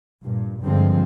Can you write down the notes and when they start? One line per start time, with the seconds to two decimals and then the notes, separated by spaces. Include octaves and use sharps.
0.23 G2 A#2
0.62 G2 D3 F3 G#3 C4